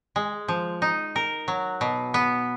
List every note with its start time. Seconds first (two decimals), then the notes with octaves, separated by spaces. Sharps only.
0.16 G#3
0.48 F3
0.82 D#4
1.16 A#4
1.48 F#3
1.81 B2
2.14 B3